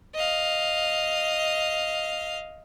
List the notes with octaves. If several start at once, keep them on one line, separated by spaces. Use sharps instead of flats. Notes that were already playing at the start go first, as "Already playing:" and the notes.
D#5 F5